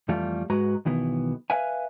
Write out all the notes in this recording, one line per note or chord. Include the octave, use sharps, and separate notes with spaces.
F2 E3 G3 A3 F4
G#2 G#3 F#4 B4 A#5
B1 D#3 E3 B3
B4 E5 F5 G#5